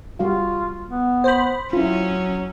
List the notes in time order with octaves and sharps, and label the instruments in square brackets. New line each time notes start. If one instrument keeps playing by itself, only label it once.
[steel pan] G3 F#4 F5 [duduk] F4
[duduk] B3
[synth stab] C5 B5
[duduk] F#3 [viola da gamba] C#4 [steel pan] E4 F4